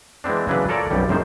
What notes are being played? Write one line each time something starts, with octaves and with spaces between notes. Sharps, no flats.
E3 G#3 B3 C4 D4
C#3 E3 F#3 D4 B4
F4 A4 A#4 C#5 D5
B1 F#2 G3
G#1 F#2 A2 D#3 C5